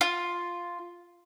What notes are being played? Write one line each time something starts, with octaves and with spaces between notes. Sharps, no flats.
F4